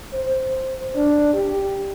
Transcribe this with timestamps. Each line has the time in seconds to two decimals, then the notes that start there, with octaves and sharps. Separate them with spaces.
0.13 C5
0.95 D4
1.34 G4